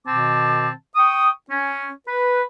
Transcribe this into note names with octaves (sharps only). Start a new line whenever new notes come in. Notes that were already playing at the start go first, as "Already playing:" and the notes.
B2 D#3 C4 A5 D6
G5 C#6 D#6
C#4
B4